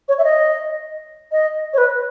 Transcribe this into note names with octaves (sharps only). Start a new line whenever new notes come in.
C#5
E5
D#5
D#5
C#5
B4